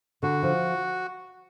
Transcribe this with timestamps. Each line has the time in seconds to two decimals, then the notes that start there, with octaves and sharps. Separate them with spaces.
0.23 D3 F#4
0.43 F3